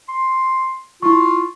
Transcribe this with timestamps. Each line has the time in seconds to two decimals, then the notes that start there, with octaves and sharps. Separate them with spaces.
0.09 C6
1.02 E4 F4 C#6